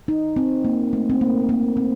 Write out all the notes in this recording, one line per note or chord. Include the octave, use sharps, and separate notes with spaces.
D#4
C4
A#3
A3
C4
A#3
A#3
C4